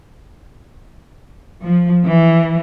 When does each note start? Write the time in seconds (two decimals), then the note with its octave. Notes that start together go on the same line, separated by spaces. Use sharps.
1.61 F3
2.05 E3